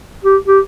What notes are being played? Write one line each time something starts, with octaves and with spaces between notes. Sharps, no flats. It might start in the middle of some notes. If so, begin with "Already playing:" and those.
G4
G4